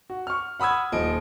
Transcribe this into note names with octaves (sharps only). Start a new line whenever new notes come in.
F#4
C#6 F6
F#5 B5 D#6 E6 G#6
D#1 F3 D#5 D7